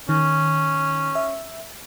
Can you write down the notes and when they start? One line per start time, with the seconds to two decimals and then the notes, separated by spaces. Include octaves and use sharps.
0.09 D#3 C#4
1.15 E5